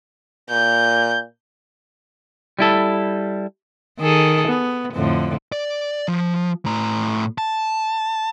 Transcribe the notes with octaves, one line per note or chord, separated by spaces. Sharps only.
A#2 G6
G3 E4 A4
D#3 G#4 A4
B3
F2 A2 D3
D5
F3
A2 A#5
A5